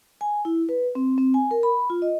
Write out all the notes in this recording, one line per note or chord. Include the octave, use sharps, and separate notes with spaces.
G#5
E4
B4
C4
C4
G#5
A#4
B5
F4
D#5